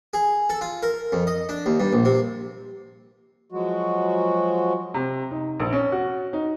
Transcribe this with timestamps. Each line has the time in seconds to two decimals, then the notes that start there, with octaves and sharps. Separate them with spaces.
0.14 G#4
0.50 A4
0.61 F4
0.83 A#4
1.12 F2
1.27 D#5
1.49 D4
1.66 D#2
1.80 G2
1.93 A#1
2.05 C3
3.52 F3 F#3 G#3 F#4
4.94 C3
5.31 D#4
5.60 A#1
5.73 C#4
5.92 F#4
6.33 D#4